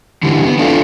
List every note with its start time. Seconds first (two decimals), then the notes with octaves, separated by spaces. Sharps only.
0.23 D3 E3 G3
0.45 B3
0.59 D4 E4 F4 A4